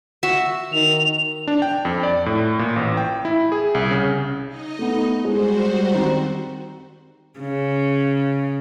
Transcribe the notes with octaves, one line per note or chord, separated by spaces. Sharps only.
F#4 E5
D#3 F7
D4
G5
F2
D5
A2
A#2
A1
G5
E4
G#4
C2
C#3
D#4 D#5
A3 B3
G3 G#3 F#4 C5
D#3 C4
C#3